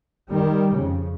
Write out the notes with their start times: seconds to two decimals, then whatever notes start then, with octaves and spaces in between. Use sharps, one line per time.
0.32 D#3 G3
0.74 F2 C#3